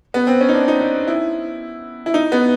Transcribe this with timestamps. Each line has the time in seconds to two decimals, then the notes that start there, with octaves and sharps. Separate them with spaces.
0.14 B3
0.27 C4
0.41 C#4
0.49 D#4
0.54 D4
0.68 D#4
0.80 D#4
1.07 E4
2.06 E4
2.14 D#4
2.32 B3